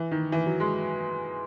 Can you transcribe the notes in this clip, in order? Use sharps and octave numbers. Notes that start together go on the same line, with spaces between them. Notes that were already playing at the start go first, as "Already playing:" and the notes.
Already playing: E3
D#3
E3
F#3
G#3